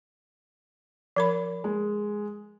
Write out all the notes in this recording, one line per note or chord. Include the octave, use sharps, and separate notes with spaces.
F3 A#4 B5
G#3